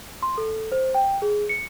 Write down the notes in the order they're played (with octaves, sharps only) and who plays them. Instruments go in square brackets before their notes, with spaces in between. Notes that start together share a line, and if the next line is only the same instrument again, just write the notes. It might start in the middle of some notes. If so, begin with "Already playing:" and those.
[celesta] C6
A4
C5
G5
G#4
C#7